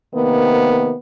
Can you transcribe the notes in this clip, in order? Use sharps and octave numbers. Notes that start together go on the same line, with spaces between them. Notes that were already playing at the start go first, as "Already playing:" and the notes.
C3 D#3 A#3 B3